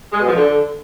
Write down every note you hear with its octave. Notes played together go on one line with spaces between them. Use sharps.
G#3
B2
F3
D3